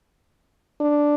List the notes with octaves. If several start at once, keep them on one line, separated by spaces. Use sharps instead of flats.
D4